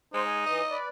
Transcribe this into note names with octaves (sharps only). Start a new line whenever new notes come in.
G#3 D#4 C5
G#5
E3 D#5
B4 D5